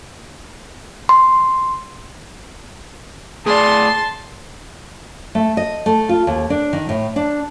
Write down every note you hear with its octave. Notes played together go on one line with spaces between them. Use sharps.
C6
A2 G#4 D5 A5 C6
A3
D#5
A3
F4
D#2
D4
D#3
A2
D4